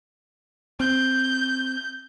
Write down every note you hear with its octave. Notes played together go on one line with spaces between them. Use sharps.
C4 G6